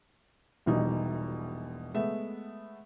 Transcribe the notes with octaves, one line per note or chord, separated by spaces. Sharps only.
E1 A#1 B2 G3 D#4
G#3 A3 B3 E5